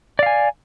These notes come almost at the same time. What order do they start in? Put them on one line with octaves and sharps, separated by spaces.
D5 F5 G#5